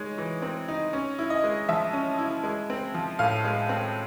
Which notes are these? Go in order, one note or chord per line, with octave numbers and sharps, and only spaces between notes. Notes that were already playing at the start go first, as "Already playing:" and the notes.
Already playing: G#3 D#4 C#5
E3
C4
D#4
C#4
E4
D#5
G#3
F3 E5
C#4
E4
G#3
C4
F3
A2 F5
G#3
C4